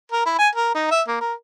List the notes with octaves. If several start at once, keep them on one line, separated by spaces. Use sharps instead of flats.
A#4
E4
G#5
A#4
D#4
E5
A#3
A#4